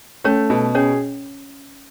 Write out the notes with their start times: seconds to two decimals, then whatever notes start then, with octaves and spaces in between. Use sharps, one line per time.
0.24 A3 C#4 C#5
0.50 B2
0.75 C#4 G#4 C#5